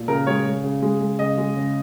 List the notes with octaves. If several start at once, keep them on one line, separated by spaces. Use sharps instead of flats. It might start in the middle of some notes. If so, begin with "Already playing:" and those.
Already playing: A#2
C#3 A#4
G#3 C#5
G#3
C#3
G#3
G#3
C#3 D#5
G#3
C#3